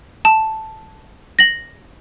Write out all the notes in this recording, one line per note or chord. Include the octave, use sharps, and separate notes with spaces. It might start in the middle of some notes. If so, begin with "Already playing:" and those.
A5
A#6 F#7